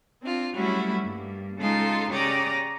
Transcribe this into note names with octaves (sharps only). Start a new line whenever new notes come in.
C4 D4 F4
F#3 G3 A3 C#4 E4 F#4
G2 A#3
C#3 G#3 D#4 F4 A4 C6
C#3 G4 C#5 D5 A#5 D#6